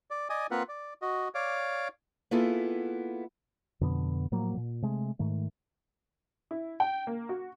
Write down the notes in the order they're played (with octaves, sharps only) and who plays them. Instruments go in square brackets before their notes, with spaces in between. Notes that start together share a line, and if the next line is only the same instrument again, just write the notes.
[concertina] D5
D5 D#5 G#5 D#6
A#3 C4 F4 B4 F#5
D5
F#4 D#5
C#5 D5 F5 D6
[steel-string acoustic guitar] A#3 B3 E4 F4 G#4 A4
[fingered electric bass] F2 B2 D3 B3
A2 F3 F#3 A#3
A#2
C3 G#3 A3
G#2 D#3 A3
[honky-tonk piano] E4
G5
A#3
F#4